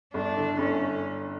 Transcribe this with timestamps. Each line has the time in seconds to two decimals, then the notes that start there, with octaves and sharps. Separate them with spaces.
0.14 G1 D4
0.37 D3
0.59 G1 C#4